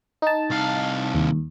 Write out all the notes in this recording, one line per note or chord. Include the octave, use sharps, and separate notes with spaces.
D#4 A5
C2 F5
D#2